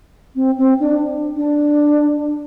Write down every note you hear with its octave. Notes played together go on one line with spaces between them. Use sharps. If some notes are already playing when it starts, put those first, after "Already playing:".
C4
C4
D4
D4